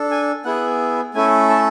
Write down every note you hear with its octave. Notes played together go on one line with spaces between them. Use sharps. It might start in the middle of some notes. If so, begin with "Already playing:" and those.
Already playing: D4 A4
G#5
B3 E4 G#4 F#5
A3 C#4 E4 A4 G#5
A5